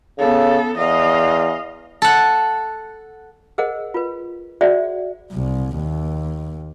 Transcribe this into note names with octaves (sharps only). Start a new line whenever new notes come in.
C#3 B3 A4
E2 D#5 F5
A4 F#5
G#4 A#4 C5 D#5 F#5
F4 B4
F#4 G#4 C5 D5 E5 F#5
C2
D#2